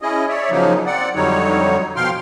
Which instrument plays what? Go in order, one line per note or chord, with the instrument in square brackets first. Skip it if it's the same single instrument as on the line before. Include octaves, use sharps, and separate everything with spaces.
[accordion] C#4 E4 G#4 D#5
C#5 D5 E5
C#3 F3 F#3 A#3 D#4
C4 D5 F#5
F2 D3 F#3 G3 D#4 C#5
B2 F3 F5 G5 C6 F6